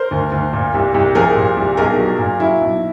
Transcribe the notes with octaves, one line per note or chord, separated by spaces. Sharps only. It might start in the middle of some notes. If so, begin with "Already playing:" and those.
Already playing: A#4 C5
D2
D2
A#2
C2
C2
F3 G#4 A#4
A#2
C2
B1 G#4 A#4
F#3
A#2
F#3 E4
B1